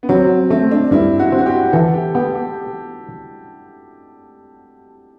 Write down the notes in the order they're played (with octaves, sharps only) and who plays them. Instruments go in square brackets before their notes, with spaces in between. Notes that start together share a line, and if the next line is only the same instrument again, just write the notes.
[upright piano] B3
[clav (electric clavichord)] F#3 [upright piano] C4
[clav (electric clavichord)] A3 [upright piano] C4
[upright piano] D4
[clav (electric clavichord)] G2 [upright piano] E4
[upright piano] F#4
[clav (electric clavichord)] C4
[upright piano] F#4
G4
[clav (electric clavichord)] E3 [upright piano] A4
[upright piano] G4
[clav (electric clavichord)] B3 [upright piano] G4
[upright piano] G4